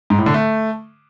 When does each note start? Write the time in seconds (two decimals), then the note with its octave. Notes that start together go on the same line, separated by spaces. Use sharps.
0.10 G#2
0.18 A2
0.26 D3
0.34 A3